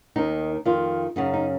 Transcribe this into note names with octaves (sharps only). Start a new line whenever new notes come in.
D#2 D#3 D#4
F2 D#3 F4
F#2 C#3 D#4
D#4